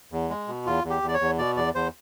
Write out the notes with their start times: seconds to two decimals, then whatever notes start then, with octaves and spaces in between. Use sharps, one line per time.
0.12 E2
0.30 G#3
0.48 B2
0.66 E2 F4
0.84 E2
0.90 G4
1.02 E2
1.08 D5
1.14 C#5
1.20 E2
1.39 B2 D5
1.56 E2 D5
1.75 E2 C5